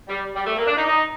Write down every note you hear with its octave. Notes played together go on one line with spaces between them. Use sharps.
G3
G3
A3
A#3
D4
D#4
D#4